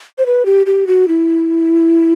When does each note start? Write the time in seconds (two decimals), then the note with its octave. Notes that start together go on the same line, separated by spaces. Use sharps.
0.18 C5
0.26 B4
0.46 G4
0.66 G4
0.87 F#4
1.08 E4